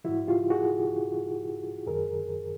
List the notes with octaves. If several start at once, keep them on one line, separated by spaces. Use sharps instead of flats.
G#2 E3 E4 F#4
F4 G4
F#4 G#4
F#2 D#3 G#4 A#4